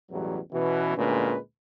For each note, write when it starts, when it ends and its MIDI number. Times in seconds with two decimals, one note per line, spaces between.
0.11 0.38 33
0.11 0.38 40
0.11 0.38 47
0.11 0.38 54
0.11 0.38 55
0.52 0.96 47
0.52 0.96 52
0.52 0.96 59
0.52 0.96 61
0.52 0.96 66
0.96 1.37 38
0.96 1.37 46
0.96 1.37 56
0.96 1.37 61
0.96 1.37 71